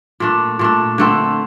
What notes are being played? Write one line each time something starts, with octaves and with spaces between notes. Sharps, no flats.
A#2 A3 D4
A#2 A3 D4
D3 A3 C4